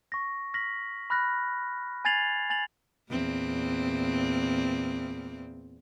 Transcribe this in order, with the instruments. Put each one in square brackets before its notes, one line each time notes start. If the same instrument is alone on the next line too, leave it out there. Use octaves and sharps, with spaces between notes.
[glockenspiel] C#6 A#6
F6 A#6 B6 F#7
B5 F6 F#6 A#6
G#5 G#6 A6 C7 F7 F#7
G#5 A6 F7 F#7
[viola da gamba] E2 A#2 C4